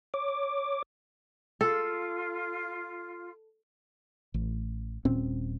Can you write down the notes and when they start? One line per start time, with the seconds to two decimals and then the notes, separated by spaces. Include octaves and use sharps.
0.14 C#5 D6
1.61 F4 A4
4.34 A1
5.05 D#1 A#2 C4 C#4